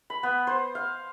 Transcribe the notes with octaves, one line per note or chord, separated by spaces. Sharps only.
B5
B3
C5
F5